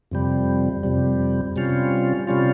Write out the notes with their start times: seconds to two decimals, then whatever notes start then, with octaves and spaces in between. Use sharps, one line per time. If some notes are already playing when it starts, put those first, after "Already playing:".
0.11 F2 C3 G3
0.83 F2 C3 G3
1.56 C3 G3 C#4 F4
2.27 C3 G3 C#4 F4